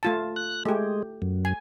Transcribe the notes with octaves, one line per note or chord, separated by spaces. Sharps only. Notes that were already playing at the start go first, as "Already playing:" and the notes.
A3 F4 A5
F#6
G#3 A3 G4
F#2
G#5